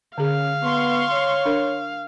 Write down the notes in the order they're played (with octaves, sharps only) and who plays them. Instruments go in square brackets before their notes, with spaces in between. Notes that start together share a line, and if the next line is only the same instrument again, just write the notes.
[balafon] D3 G#4 [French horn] C#4 [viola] F5
[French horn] B3 [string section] C6 C#6
[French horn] C#5
[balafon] D4 A#4